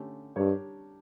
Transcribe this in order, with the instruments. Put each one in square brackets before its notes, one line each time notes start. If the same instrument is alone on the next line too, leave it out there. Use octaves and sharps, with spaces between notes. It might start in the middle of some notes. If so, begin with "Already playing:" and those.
Already playing: [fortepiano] D3 A3 C#4 G4
[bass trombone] G2 [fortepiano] G3 D4 G4 A#4 C#5